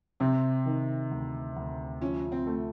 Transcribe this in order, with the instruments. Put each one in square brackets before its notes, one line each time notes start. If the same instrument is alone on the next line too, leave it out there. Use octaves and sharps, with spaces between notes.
[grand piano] C3 [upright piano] C4
[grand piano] D#3
D2
D2
[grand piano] F3 [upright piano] C#4
[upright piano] C4
[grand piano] A3